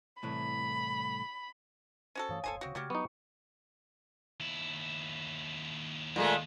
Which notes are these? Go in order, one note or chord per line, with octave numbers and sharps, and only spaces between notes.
C2 A2 E3 B5
C#4 F#4 A4 C5
G2 E3 A3 C#5 F5 D#6
D1 G1 A4 C5 G#5
D1 C#3 C4 F#4
C#3 G3 A3 F#4 G4 F6 G#6
F#3 B3 D#4 C#6 C#7
D#2 E4
A#2 G#3 A3